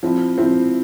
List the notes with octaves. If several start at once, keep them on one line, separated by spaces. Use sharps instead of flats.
F3 C4 E4
F3 C4 E4